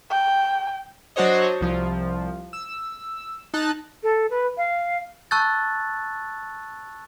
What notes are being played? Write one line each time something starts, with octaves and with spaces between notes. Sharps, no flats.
G5
F#3 D4 F#4 C5 C#5 D#5
C2 F3
E6
D#4 A5 F#6
A4
B4
F5
A5 C#6 E6 F#6 G6 A6